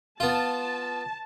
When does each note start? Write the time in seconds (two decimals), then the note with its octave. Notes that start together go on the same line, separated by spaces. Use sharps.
0.20 B3 F4 A5